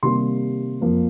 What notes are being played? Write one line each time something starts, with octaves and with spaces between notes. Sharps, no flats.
C3 D#3 G3 A#3 C6
F2 F3 A#3